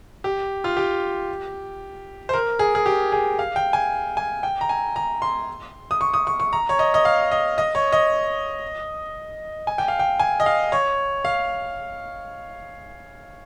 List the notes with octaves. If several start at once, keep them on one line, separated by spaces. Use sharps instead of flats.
G4
F4
G4
C5
A#4
G#4
G#4
G4
G#4
F5
G5
G#5
G#5
G5
A#5
G#5
A#5
C6
D#6
C#6
D#6
C#6
C#6
A#5
C#5
D#5
D#5
F5
D#5
D#5
C#5
D#5
G#5
G5
F5
G5
G#5
D#5
F5
C#5
F5